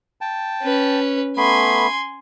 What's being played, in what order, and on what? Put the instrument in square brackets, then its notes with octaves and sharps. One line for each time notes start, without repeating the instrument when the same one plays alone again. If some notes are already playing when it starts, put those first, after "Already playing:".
[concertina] G5 A5
[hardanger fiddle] C#4 B4
[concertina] A3 B3 B5 [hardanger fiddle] G#5 C6